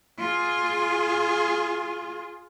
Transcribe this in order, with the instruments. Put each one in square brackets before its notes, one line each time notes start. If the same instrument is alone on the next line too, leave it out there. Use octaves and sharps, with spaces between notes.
[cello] F4 G#4